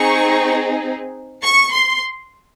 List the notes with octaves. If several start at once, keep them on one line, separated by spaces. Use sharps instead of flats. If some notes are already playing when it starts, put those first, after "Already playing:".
Already playing: C4 D#4 G#4 C#6
C#6
C6